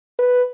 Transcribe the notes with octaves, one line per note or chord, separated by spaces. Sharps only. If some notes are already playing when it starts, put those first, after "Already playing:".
B4